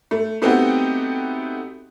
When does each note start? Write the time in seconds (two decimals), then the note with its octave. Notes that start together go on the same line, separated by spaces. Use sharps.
0.11 A3
0.42 A3 B3 C4 D#4 F#4 G4